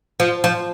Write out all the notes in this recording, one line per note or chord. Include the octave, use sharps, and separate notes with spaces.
F3
F3